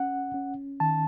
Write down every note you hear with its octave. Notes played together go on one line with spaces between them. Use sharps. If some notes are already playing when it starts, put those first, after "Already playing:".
Already playing: C#4 F#5
C#4
D#3 A5